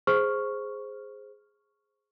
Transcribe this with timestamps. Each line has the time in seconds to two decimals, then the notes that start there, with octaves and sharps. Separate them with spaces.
0.07 G#4 C5 C#6 F6